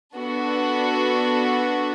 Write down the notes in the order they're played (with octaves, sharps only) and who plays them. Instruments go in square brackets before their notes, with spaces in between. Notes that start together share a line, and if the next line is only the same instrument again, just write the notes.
[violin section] B3 D4 F#4 A4